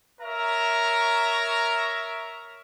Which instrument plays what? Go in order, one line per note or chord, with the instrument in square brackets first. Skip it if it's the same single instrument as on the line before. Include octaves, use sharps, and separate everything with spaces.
[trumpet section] A#4 C#5 E5 A#5